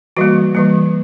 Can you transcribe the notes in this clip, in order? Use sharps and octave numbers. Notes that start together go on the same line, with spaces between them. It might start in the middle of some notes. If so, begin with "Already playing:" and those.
E3 G3 A#3 F#4
E3 G3 A#3